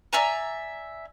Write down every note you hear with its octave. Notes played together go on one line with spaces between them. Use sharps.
D5 E5 G#5 A#5